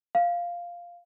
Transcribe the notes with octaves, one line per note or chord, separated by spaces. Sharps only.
F5